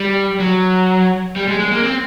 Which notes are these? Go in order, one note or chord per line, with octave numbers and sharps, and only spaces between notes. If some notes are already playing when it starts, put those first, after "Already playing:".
Already playing: G3
F#3
G3
G#3
G#3
A#3
C4